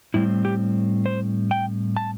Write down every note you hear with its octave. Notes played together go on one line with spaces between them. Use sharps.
A2 G3 C4 E4
G4
C5
G5
A5